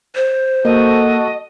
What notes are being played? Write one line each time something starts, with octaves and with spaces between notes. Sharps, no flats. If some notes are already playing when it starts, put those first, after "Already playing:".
C5
A#3 F#4 A4 D#5